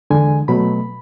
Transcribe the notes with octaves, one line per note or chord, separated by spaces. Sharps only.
E2 D3 G#3 G#5
B2 F#3 A3 B5